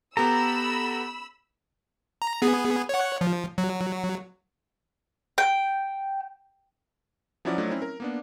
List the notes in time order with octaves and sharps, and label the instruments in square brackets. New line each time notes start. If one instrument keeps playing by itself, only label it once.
[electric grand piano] B3 G4 A4 [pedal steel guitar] A#5 [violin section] B5 E6
[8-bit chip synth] A#5
B3 G#4
C#5 F#5
F3
F#3
[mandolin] G5
[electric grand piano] F3 F#3 C#4 E4 F#4 D5
F3 F#3 A3 D4 D#4
C4 C#4 E4
A#4
A#3 B3 D4